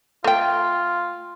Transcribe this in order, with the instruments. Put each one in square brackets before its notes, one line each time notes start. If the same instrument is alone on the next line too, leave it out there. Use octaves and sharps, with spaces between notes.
[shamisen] A3 G5 [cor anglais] F4